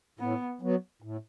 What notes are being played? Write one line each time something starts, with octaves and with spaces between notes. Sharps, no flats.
A2 B3
F#3 B3
A2